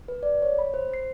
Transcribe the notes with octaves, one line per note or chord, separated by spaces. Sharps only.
B4
D5
C#5
B5
C5
C7